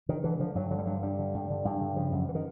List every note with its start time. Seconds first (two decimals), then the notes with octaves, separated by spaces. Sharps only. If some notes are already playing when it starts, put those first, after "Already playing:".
0.09 D3 D#3
0.24 D3 E3
0.40 D3 F3
0.55 G2 F#3
0.71 D3 F#3
0.78 G3
0.86 G2 F#3
1.03 G2 G3
1.19 D3
1.34 G2
1.50 D3
1.65 G2
1.81 D3
1.96 C#3 F3
2.12 F#2
2.29 E3
2.35 D#3